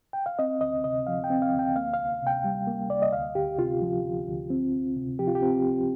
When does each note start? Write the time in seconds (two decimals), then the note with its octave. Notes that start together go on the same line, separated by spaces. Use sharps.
0.13 G5
0.26 F5
0.39 C4 D#5
0.61 D2 D#5
0.84 C3 D#5
1.07 F3 F5
1.24 G5
1.30 C4
1.42 F5
1.53 D2
1.59 G5
1.76 A#3 F5
1.94 F5
1.99 C2
2.22 C3 G5
2.44 G3
2.67 A#3
2.90 C2 D5
3.02 D#5
3.12 D2 F5
3.35 D2 G4
3.59 C3 F4
3.82 F3
4.05 D2
4.28 D2
4.50 C4
4.73 C2
4.96 C3
5.19 F3 G4
5.27 F4
5.35 G4
5.42 C4
5.65 C2